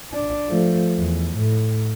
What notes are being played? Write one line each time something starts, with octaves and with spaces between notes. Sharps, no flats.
D4
F3 A3
E2
A2